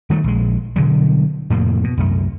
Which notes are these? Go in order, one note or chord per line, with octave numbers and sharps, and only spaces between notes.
D#3 G3 A3
A#1 G#3
B2 D3 F#3 G3
F2 A2 C3 A#3
B2
C2 F#2 A3